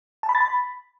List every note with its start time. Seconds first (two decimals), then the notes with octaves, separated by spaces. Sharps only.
0.23 A5
0.29 B5
0.35 A6
0.40 B5